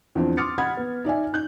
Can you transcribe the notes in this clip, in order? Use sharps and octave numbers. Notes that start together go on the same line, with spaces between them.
E2 F3 C4 D4
C6 D6 D#6 F6 A6 C#7
F#5 B5 D#6 G#6
B3
D#4 D5 E5 G#5
D#4 F#6 G6